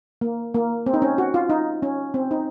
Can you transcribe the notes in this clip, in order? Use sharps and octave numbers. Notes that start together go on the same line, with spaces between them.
A#3
A#3
C4
D#4
C#4
F#4
F4
D#4
C#4
C4
D#4